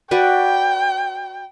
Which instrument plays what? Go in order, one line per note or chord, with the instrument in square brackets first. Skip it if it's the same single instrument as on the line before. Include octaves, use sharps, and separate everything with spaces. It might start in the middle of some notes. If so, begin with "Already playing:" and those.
[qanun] F#4 B4 D5 [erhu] G5